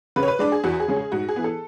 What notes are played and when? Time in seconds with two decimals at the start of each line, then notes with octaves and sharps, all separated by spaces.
0.16 C#3 B4
0.23 C#5
0.28 B4
0.39 G#3 D4 D5
0.52 G#4
0.64 E2 F#4
0.80 G#4
0.88 C#3 G#3 C#4
0.96 G#4
1.12 G#2 F#4
1.29 G#4
1.36 E3 B3
1.44 A4